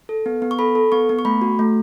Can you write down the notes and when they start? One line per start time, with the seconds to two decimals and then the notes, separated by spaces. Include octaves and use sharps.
0.09 A4
0.26 B3
0.42 B3
0.51 C#6
0.59 A4 B5
0.75 A4
0.92 B3 C#6
1.09 B3
1.19 C#6
1.25 A3 B5
1.42 F#4
1.59 A3